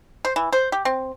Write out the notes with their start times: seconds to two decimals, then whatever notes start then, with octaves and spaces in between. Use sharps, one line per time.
0.25 C5
0.36 E3
0.53 C5
0.72 G4
0.85 C4